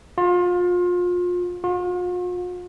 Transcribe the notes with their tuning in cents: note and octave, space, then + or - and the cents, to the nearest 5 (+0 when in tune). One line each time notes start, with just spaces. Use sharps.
F4 +30
F4 +45